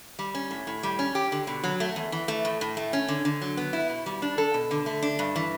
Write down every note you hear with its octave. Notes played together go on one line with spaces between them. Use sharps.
G3
C#4
A2
A2
G3
C#4
G4
D3
B2
F#3
A3
E2
E3
A3
A2
A2
A3
C#4
D3
D3
F#3
B3
E4
B2
G3
D4
A4
B2
D3
A3
D4
G2
E3